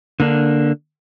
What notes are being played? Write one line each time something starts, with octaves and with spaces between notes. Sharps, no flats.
D3 A#3 D4